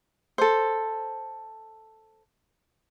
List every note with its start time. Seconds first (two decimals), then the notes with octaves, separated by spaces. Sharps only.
0.38 A4 C5